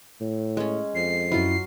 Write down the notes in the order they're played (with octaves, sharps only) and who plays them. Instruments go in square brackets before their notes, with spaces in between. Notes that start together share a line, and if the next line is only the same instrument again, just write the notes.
[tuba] A2
[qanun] G#3 C#4
[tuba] F2 [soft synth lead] C7
[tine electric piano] F#2 E4 [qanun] F#3 F4